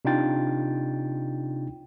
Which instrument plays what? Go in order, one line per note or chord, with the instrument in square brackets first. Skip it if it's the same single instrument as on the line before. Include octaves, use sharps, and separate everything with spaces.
[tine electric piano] C3 D4 D#4 F4 G5 A6